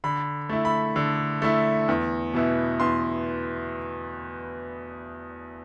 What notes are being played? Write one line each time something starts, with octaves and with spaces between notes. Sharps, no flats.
D3 B5
A3 E4
B5
D3
A3 E4
E2
B2 B3 E4
E2 C6